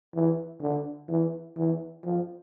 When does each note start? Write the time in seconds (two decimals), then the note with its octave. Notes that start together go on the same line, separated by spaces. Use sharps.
0.15 E3
0.61 D3
1.08 E3
1.56 E3
2.04 F3